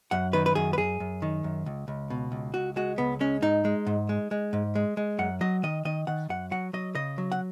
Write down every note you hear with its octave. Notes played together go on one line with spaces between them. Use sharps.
F#2 F#5
D#3 B4
B4
F#2 G#4
B4
F#2 G#4
F#2
D#3
F#2
C#2
C#2
B2
C#2
C#2 F#4
G#3 F#4
C#2 B3
G#3 C#4
G#2 D#4
G#3
G#2
G#3
G#3
G#2
G#3
G#3
F#2 F#5
F#3 D#5
D#3 D#5
D#3 D#5
D#3 F#5
F#2 F#5
F#3 F#5
F#3 D#5
C#3 D#5
F#3
F#5